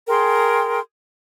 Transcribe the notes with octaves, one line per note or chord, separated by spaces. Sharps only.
G#4 A#4 G5 C6